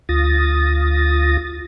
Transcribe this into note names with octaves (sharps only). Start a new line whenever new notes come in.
D2 F4 D#6 A6 A#6